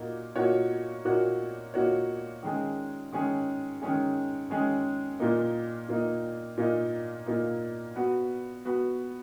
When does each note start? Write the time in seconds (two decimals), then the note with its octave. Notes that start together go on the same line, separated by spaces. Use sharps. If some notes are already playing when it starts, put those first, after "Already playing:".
Already playing: A#2 A#3 D#4 F#4
0.36 A#2 A#3 D#4 F#4 C#5
1.05 A#2 A#3 D#4 F#4 C#5
1.74 A#2 A#3 D#4 F#4 C#5
2.43 D#3 G#3 C#4 G#4
3.12 D#3 G#3 C#4 G#4
3.82 D#3 G#3 C#4 G#4
4.50 D#3 G#3 C#4 G#4
5.19 A#2 A#3 D#4
5.89 A#2 A#3 D#4
6.57 A#2 A#3 D#4
7.26 A#2 A#3 D#4
7.96 B3 F#4 B4
8.65 B3 F#4 B4